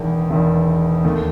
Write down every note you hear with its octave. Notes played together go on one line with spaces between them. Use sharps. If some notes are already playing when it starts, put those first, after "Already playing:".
Already playing: E1 E2 D#3
E1 E2 D#3
D#2 D#3 A3